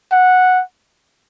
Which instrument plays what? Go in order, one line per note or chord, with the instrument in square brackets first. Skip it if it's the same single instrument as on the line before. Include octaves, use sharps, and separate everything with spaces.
[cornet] F#5